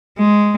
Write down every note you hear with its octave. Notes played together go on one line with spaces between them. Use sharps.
G#3